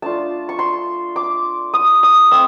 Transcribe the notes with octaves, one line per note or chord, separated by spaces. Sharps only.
A3 D4 F4 A5
C#6
C6
D6
D#6
D#6
A3 C4 E6